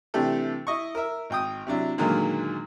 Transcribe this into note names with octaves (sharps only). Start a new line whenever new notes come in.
C3 E3 A3 D4 G4 A4
E4 D#5 C#6
A#4 E5
G#1 G5 D#6
C3 F#3 D4 E4
A#2 D3 D#3 F#3 G#3 A#3